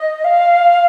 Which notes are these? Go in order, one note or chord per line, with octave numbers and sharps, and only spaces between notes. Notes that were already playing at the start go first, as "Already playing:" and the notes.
Already playing: D#5
F5